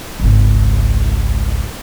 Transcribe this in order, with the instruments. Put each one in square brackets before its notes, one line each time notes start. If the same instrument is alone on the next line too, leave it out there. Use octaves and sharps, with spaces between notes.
[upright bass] G#1 C#2